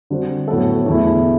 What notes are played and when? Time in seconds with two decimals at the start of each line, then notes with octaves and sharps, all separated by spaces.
0.10 D3 G3 C4 F#4
0.48 A2 F#3 B3 F#4 A4
0.86 E2 D3 A3 E4